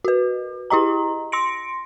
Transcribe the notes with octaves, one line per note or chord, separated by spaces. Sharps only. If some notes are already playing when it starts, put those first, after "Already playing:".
F#4 B4
E4 G4 D#5 A#5
C6 A#6 C#7 D7